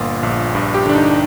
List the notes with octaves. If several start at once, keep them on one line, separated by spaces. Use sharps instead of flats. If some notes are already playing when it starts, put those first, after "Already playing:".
Already playing: G1 A#2 F4
A#1
G2
G4
D3 D4
D#4